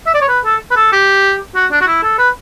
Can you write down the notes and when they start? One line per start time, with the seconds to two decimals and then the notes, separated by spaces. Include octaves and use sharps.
0.06 E5
0.14 D5
0.21 C#5
0.28 B4
0.45 A4
0.71 B4
0.76 A4
0.92 G4
1.55 F#4
1.71 D4
1.81 F#4
1.87 E4
2.03 A4
2.18 B4